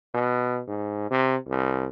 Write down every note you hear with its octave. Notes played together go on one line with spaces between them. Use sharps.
B2
G#2
C3
C2